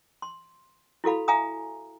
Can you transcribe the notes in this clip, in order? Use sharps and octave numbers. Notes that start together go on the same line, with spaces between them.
C6
E4 F#4 A4 F5 B5
E5 F5 G#5 A#5 D#6